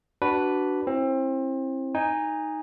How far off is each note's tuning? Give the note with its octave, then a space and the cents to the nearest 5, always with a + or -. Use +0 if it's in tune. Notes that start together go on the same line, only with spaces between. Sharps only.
D4 +0 F#4 +20 B4 +0
C4 +30 E4 +0
D#4 +0 G#5 -20